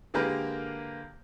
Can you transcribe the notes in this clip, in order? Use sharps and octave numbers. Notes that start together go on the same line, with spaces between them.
D3 G#3 A#3 G4 A#4 B4